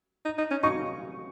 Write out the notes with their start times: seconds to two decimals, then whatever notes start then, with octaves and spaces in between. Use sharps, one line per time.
0.25 D#4
0.38 D#4
0.51 C#4
0.63 D#4 C#6